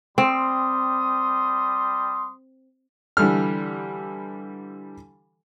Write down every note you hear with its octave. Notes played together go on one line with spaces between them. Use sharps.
G3 C4 C6 D#6
D3 E3 G3 A4 F6